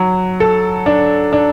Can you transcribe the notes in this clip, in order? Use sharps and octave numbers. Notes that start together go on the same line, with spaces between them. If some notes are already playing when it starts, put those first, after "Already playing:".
Already playing: F#3
A4
D4
D4